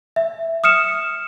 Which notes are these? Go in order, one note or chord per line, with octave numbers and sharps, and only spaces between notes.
E5
D#6 F6 C#7 E7